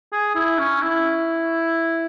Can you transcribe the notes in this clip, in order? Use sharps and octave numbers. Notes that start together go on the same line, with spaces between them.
G#4
E4
C#4
E4